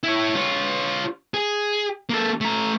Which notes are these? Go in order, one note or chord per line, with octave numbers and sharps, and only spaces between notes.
E4 C#5
F4 C#5
G#4
A#3 A4
A3 A#5